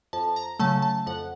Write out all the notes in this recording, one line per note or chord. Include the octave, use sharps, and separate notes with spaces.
F2 A5
A#5
C#3 F#3 A3 A5
A5
F2 F#5